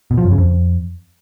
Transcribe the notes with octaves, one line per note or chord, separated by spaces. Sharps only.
B2
F3
F#2
C#3
F2